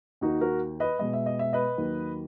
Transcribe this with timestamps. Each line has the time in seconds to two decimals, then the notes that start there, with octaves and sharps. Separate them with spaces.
0.21 D#2 D#3 A#3 D#4 F#4
0.41 F#4 A#4
0.80 B4 D#5
0.99 B2 G#3 B3 D#5
1.13 E5
1.26 D#5
1.39 E5
1.53 B4 D#5
1.78 D#2 D#3 F#3 A#3